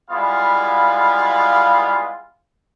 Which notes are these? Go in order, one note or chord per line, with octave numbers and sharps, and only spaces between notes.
G3 G#3 B3 E4 F4 F5